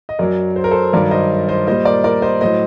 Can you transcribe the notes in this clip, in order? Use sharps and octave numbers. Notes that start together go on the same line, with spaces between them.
D#5
F#2 F#3 A#4 D5
C5
A#4
A4 C5
G2 D#3 F#3 A#4 D5
C5 D#5
C5 D#5
A#2 G3 C5 D#5
A#4 D5
A#4 D5
C5 D#5
A2 F#3 C5 D#5